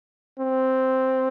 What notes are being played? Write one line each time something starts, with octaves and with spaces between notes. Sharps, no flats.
C4